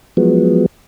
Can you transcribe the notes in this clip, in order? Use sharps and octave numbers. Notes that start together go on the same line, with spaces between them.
F3 F#3 G#3 B3